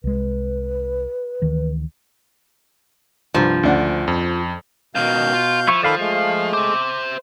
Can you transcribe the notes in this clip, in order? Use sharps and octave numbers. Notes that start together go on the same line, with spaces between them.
C2 G#3 B4
D2 D#3 E3
C2 G2 F3
D2 C#3 D4 F#5
F2
C#2 B2 D#3 F5 G6
F4
F3 E4 C#6
D#3 A4 D5 F5 B5
G#3 A3 F5
C5 E5 D6